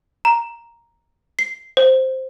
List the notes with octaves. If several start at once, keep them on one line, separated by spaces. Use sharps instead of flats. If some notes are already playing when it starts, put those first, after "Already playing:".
A#5
C7
C5